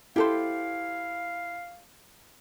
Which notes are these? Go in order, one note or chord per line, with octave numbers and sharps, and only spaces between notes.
E4 G4 A4 C5 F5